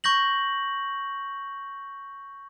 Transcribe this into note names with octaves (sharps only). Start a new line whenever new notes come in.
C#6 G6 A#6 F#7